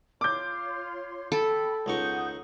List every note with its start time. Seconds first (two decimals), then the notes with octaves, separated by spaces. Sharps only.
0.21 F4 C#5 C6 D6 G6
1.32 A4 G5 B5
1.86 C#2 D#4 F#5 C#6 D#6 G6